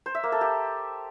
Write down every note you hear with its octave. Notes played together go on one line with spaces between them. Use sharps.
C5
E5
A#3
A4
G4